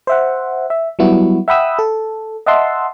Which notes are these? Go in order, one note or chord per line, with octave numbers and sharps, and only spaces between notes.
C5 E5 F#5
E5
F#3 G3 B3 E4 F#4
E5 F#5 G5 B5 D#6 E6
A4
D#5 E5 F#5 A5 C6 E6